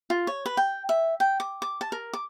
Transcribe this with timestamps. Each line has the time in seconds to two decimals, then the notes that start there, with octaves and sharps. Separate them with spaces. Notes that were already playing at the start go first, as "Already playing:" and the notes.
0.10 F4
0.27 C#5
0.46 B4
0.57 G5
0.89 E5
1.20 G5
1.40 D6
1.62 D6
1.81 A5
1.92 A#4
2.13 D6